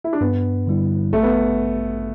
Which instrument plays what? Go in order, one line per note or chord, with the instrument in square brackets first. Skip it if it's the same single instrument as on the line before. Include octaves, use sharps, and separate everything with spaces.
[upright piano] E4
D4
[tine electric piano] G2 [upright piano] B3
[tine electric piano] D3 G3 E4
[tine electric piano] A1 [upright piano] A3
[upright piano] B3